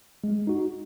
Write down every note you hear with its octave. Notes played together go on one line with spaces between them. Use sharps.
G#3
D#4 F#4